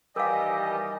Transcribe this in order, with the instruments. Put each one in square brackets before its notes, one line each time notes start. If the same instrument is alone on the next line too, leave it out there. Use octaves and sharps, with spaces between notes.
[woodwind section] D#3 E3 D#5 [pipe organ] G3 G4 [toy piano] A#4 F5 [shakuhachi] G#5